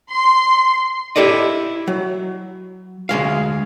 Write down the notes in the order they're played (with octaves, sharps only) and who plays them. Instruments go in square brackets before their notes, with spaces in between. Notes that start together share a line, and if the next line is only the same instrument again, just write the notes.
[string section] C6
[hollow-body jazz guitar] E4 G4 A4 D5 D#5
F#3
D2 G#3 F5